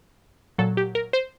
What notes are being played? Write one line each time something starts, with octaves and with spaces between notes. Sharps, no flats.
A#2 F#3 A4
G4
A#4
C5